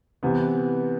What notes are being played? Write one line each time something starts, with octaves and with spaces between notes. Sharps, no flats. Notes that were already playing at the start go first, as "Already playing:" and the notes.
C3 E3 B3